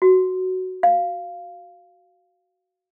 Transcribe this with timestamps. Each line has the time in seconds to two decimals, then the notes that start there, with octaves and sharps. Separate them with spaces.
0.02 F#4
0.83 F5